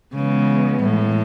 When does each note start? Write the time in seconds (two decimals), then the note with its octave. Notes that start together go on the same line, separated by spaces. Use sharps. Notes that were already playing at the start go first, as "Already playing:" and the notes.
0.14 C#3 E3 G#3 B3
0.83 A2